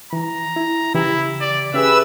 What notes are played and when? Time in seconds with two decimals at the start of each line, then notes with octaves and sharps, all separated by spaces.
0.13 E3 A#5
0.56 E4
0.95 C#3 E3 E4 G4
1.41 D5
1.74 C#4 G4 G#4 B4 E5 E6